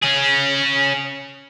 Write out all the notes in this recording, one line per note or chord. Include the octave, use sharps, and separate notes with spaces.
C#4 G#4